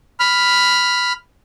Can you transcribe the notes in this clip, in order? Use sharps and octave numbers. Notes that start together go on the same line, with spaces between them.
B5 F6